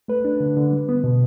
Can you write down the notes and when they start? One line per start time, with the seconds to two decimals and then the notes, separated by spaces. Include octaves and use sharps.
0.08 A3 B4
0.25 D4
0.40 D3
0.57 D3
0.72 G3
0.89 B3
1.04 B2